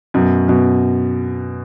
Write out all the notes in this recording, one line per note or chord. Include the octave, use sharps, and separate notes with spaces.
F#2 B2
F#2 B2